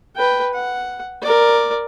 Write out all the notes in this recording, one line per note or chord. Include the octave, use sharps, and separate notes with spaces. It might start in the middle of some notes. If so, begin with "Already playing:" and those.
B4 G5
F#5
A#4 D5